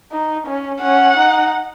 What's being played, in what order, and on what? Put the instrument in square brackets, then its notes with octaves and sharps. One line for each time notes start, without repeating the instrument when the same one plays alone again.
[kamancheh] D#4
C#4
[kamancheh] C#4 [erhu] F#5
[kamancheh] D#4